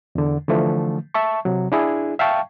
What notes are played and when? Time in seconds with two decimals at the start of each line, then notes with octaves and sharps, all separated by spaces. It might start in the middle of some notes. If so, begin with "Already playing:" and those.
0.15 E2 D3
0.48 D3 E3 F3 A3
1.14 E5 A5 C#6
1.45 C3 F#3
1.72 D4 E4 G#4
2.19 E5 F5 G5 A5 C#6